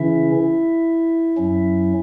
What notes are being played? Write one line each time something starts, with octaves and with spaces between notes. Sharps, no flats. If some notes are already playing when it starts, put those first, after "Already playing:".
Already playing: C#3 E3 C#4 E4 E5
F#2 F#3 C#4